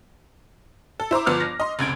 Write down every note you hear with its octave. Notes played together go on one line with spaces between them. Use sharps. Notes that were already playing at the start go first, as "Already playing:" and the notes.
A4
E4 C5 A#5 D6
G1 F3 B3 F6
A#6
D#5 C6
F1 C#2 G#6 D7